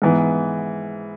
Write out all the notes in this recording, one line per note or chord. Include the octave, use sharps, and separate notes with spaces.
G#2 E3 B3